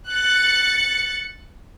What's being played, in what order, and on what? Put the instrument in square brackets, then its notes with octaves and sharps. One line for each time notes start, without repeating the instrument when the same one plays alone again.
[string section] F#6 A6 C#7